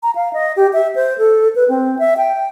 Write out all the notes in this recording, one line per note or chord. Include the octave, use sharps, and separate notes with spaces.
A#5
F5
D#5
G4
E5
C5
A4
B4
C4
E5
G5